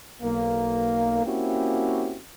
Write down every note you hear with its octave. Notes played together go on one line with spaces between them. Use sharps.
B1 A#3
A#3 C4 C#4 E4 F#4 G4